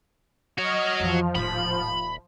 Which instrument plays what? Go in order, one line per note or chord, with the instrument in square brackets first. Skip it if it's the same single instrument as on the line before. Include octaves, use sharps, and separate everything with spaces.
[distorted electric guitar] F#4 C#5 [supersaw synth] D#5 F6
[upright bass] F2 E3 [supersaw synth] F3
[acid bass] D#1 [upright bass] A2 [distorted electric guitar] B5